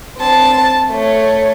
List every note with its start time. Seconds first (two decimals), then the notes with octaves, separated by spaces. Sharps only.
0.18 C4 A5
0.92 A3 C#5